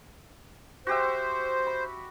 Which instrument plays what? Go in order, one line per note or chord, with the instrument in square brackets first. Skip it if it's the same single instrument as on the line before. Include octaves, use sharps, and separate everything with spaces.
[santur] F#4 G4 E5 [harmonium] C5
[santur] B5